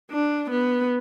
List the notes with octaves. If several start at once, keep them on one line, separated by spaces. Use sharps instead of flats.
D4
B3